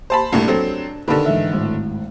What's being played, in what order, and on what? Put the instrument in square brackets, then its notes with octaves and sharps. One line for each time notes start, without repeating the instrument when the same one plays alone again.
[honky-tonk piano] C5 A5 B5
[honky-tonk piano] C2 A2 [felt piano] D4
[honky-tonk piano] F#3 C4 A4
[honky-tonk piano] D3 D#3 [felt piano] B4 A5 B5
[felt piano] G#2 E3 E5
G#1 A2